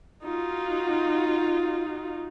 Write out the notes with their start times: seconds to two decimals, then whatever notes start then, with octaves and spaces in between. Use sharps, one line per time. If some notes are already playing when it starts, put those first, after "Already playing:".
0.23 D#4 F4 F#4